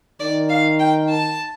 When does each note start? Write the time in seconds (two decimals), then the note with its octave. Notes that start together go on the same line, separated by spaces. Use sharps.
0.20 D#3 D5
0.49 F5
0.79 G5
1.09 A5